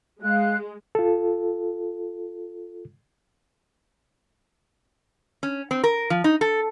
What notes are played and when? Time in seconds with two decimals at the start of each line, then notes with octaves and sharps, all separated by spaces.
0.22 G#3 F5 F#6
0.95 F4 A4
5.43 C#4
5.71 C4
5.84 A#4
6.10 F3
6.24 D#4
6.41 A4